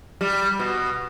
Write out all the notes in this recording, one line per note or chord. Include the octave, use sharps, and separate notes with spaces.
G3
B2